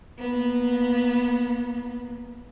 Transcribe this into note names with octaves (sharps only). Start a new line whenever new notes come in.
A#3 B3